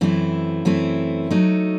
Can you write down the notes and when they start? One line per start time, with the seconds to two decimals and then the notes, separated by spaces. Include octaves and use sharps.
0.01 F#2 E3 A3 C4 E4
0.65 F#2 E3 A3 C4 E4
1.30 F#3 A3 D#4